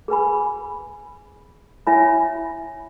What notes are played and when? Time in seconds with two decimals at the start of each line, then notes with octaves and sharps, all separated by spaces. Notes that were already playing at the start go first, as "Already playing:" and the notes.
0.08 G#4 B4 G#5 B5
1.87 E4 C#5 E5 G#5 B5